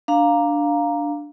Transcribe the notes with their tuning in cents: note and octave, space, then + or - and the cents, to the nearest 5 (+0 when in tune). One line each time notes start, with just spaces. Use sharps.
D4 +0 F5 +5 A#5 +0